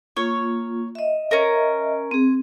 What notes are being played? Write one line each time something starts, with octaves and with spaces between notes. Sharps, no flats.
A#3 F4 C#5
D#5 E5
C#4 A#4
C4 G#4